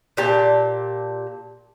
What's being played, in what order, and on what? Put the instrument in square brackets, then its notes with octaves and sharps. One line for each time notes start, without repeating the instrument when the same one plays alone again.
[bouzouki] A#2 G4 A5